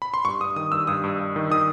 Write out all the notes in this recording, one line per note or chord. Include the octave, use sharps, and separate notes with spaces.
B5
C6
G2 C#6
G2 D#6
D#3 D#6
G2 E6
G2 D#6
G2
G2
D#3
D#3 D#6